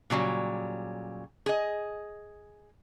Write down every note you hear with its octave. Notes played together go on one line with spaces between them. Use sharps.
A#2 C#3 F#3 G3
G#4 D#5